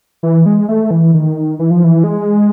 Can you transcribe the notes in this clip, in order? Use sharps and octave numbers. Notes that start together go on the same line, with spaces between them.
E3
G#3
A3
E3
D#3
E3
F3
E3
G#3